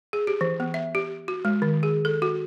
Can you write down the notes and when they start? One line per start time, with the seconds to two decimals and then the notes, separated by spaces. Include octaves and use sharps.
0.13 G#4
0.27 G4
0.41 E3
0.60 B3
0.74 E5
0.95 G4
1.28 F#4
1.45 G#3
1.62 D#3
1.83 G#4
2.05 A4
2.22 F#4